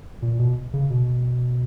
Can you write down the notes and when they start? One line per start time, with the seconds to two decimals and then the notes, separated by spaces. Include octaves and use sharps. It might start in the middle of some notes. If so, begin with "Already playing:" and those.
0.22 A#2
0.39 B2
0.74 C#3
0.90 B2